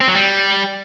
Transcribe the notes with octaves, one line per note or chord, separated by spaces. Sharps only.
C4
F#3
G3